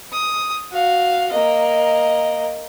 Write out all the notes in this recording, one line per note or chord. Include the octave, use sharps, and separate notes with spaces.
D#6
F#4 F5
A#3 D#5